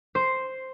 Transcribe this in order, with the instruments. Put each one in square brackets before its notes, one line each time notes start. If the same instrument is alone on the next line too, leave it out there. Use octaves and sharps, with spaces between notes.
[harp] C5